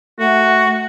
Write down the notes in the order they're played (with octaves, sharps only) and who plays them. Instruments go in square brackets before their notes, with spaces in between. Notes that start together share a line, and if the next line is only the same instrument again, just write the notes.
[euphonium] A3 [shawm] F#4 [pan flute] F#5